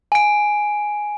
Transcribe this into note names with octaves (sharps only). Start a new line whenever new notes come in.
G#5 D7